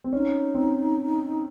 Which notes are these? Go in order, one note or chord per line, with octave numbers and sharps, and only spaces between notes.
C4
C#4 D#4
C4